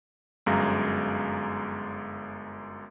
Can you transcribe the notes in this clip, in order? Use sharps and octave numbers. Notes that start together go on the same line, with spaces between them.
G1 F#2 G#3 F5 A#5